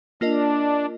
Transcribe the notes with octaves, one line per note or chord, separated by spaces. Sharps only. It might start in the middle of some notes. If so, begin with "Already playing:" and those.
A#3 D4 F4 A#4 D#5